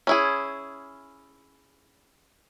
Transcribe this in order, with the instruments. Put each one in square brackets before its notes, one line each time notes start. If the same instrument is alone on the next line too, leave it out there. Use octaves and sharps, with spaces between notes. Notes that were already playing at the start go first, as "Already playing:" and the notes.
[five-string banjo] C#4 E4 G#4